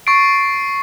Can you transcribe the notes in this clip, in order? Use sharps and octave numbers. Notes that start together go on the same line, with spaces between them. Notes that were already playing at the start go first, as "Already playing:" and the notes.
C#6 A6 C7 D7